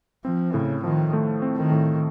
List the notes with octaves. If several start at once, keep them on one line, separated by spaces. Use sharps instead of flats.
F3 C4
A2 C#3
D#3 F3
A3
C4
D#3
A2